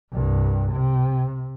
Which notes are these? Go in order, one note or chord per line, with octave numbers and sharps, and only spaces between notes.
C2 G2
C3